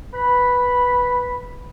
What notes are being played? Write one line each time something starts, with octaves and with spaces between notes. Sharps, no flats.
B4 B5